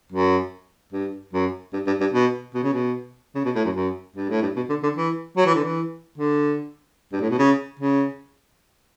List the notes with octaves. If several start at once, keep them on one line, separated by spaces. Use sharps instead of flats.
F#2
G2
F#2
G2
G2
G2
B2
B2
C#3
B2
C#3
B2
A2
F#2
F#2
G2
A2
G2
B2
D3
D3
E3
F#3
E3
D3
E3
D3
G2
A2
B2
C#3
C#3